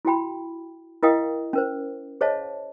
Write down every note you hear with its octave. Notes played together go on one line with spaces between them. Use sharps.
E4 F#4 G5 B5
E4 A#4 D#5 F5 G5 D#6
C#4 A#4 C5
G#4 C5 C#5 D#5 F5 A5